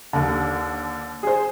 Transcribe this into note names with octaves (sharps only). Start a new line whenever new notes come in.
D#2 D3
G#4 C5